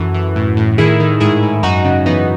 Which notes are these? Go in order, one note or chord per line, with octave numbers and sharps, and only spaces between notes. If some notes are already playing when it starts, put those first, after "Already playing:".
Already playing: F#2 E3 F#4 A4
E3
A2
A2
D#3 E4 G#4
D#3
G#2 E4 G#4
G#2
F#2 D#4 F#4
C#3
E3 B3 D#4